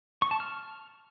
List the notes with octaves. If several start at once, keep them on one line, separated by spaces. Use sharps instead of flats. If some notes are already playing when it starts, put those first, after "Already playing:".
C#6
A5
F6